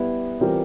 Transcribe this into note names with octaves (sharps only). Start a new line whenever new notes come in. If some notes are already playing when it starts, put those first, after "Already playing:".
Already playing: G3 B3 E4
E3 G3 C4 F4 A#4